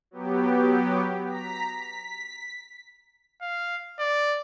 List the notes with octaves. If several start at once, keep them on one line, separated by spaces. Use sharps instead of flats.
F#3 B3 G4
A#5 B6
B6
F5
D5